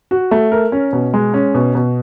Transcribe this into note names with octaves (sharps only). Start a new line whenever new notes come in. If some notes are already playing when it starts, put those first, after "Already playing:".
F#4
A3
A#4
C#4
B2
G#3
C#4
B2
B2